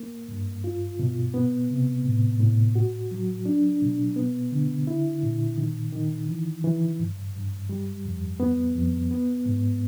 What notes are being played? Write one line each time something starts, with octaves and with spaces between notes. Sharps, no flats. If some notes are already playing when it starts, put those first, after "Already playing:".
Already playing: A#3
G2
F4
B2
B3
C3
A2
A2
F#4
F#3
D4
B2
B3
D3
E4
A#2
D#3
D#3
E3
E3
G2
G2
G3
F2
B3
F2
B3
G#2